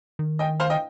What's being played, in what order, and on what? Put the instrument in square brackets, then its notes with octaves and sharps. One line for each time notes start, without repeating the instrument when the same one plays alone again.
[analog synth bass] D#3
[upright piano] D#5 G5
C5 F5
D#5 G5